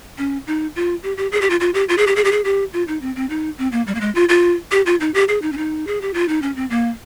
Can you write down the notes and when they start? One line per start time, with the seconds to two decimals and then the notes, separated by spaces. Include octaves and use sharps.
0.18 C#4
0.47 D#4
0.76 F4
1.03 G4
1.17 G4
1.32 G#4
1.41 G4
1.50 F4
1.60 F4
1.74 G4
1.89 F4
1.98 G#4
2.07 G4
2.16 G#4
2.24 G4
2.32 G#4
2.45 G4
2.73 F4
2.88 D#4
3.01 C4
3.16 C4
3.30 D#4
3.58 C4
3.72 A#3
3.87 G3
3.95 A#3
4.01 G#3
4.15 F4
4.29 F4
4.72 G4
4.86 F4
5.00 D#4
5.14 G4
5.28 G#4
5.42 D#4
5.52 C#4
5.57 D#4
5.87 G#4
6.01 G4
6.14 F4
6.28 D#4
6.42 C#4
6.56 C4
6.70 A#3